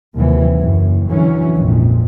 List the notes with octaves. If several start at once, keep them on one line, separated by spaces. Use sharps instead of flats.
D#2 C3 E3 F#3
F#1 F#2
D3 E3 F#3 C#4
A#1 F2 G#2